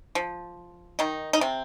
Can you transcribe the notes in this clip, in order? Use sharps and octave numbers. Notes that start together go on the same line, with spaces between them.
F3
D#3 D#4
D#4
C3 C4